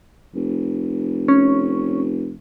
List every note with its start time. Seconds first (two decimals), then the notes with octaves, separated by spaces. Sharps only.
0.35 F1
1.28 C#4